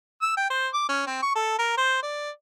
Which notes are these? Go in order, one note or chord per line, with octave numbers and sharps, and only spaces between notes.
E6
G5
C5
D6
C#4
C4
C#6
A4
A#4
C5
D5